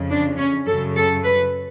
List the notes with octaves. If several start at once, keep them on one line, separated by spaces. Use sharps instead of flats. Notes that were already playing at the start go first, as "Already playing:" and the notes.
Already playing: F2 C#3
D4
C#4
F#2 C#3 A4
A4
B4